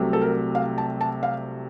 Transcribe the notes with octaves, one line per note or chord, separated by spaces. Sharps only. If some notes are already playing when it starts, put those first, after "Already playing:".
Already playing: C2 C3 F#3 A3
A4
A#4
F5
A5
A5
F5